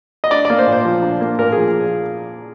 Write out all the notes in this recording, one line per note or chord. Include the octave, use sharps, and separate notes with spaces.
D#5
D4 D5
D5
A#3
C5
A#2
C5
F3
D4
A#3
A#2 A#4
F3 G#4